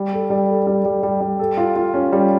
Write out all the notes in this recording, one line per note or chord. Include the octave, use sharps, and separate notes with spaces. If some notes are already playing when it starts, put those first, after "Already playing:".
Already playing: G3
A4
G3
A4
G3
G3
G3
G3
A4
F4
F4
C#4
G3